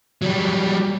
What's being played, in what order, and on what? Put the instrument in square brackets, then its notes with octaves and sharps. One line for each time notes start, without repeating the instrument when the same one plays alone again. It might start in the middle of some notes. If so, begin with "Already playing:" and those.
[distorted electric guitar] F#3 G3